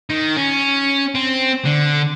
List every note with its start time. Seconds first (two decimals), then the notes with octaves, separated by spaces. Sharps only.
0.10 D#3
0.36 C#4
1.15 C4
1.65 D3